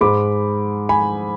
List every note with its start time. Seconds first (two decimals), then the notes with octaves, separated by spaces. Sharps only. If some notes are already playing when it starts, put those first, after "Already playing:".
0.01 G#2 G#3 B5 D6
0.89 G#5 B5